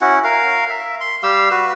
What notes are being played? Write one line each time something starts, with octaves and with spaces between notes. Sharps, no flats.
C#4 E4 F#4 F#5
A#4 F5
E5
C6
G3 G4 F5 E6
F#4 B4